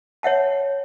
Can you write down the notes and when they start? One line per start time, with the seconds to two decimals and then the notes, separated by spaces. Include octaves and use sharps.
0.23 C#5 E5 F#5 A5